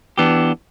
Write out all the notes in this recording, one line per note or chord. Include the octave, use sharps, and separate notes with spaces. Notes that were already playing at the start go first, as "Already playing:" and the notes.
E3 B3 D4 G4